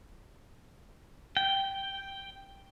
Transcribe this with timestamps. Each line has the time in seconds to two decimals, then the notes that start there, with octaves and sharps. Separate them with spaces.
1.37 G5